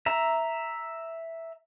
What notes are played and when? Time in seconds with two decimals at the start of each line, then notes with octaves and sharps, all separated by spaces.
0.06 E5 A#5